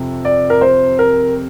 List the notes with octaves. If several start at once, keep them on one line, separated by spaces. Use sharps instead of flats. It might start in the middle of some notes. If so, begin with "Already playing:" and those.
Already playing: F2 C3
D5
A#4
C5
A#4